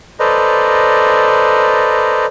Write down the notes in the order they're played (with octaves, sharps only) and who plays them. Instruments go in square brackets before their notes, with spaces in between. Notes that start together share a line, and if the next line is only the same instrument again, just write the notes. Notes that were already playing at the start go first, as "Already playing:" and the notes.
[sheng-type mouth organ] A4 B4 C5 D5 D#5 A#5